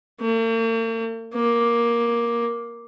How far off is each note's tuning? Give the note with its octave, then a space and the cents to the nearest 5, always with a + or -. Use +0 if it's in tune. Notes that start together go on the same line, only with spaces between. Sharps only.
A#3 -45
A#3 +10